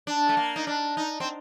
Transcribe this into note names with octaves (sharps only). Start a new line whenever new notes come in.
D4
A3
A#3
D#4
D4
D#4
C4